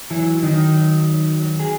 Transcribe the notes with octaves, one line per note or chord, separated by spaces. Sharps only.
E3 F#3 E4
D#3 F#3 D#4
F#3
F#3
F#3
G#4